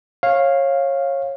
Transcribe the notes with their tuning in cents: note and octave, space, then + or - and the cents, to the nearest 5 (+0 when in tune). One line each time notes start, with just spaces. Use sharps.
C#5 -20 F5 +0